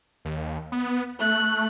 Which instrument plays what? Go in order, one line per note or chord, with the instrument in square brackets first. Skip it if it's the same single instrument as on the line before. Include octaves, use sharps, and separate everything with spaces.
[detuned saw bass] D#2
B3
[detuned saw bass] A3 [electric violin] F#6